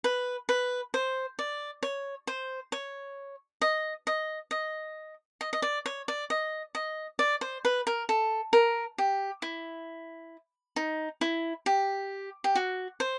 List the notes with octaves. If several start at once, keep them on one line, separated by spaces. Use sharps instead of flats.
B4
B4
C5
D5
C#5
C5
C#5
D#5
D#5
D#5
D#5
D#5
D5
C#5
D5
D#5
D#5
D5
C5
B4
A#4
A4
A#4
G4
E4
D#4
E4
G4
G4
F#4
C5